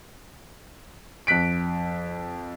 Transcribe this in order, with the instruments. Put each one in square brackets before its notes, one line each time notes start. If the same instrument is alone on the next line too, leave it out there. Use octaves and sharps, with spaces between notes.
[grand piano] F2 F#6 B6 D7